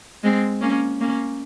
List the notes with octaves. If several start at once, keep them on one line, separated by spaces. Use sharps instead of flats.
G#3 C4
A#3 C#4
A#3 C#4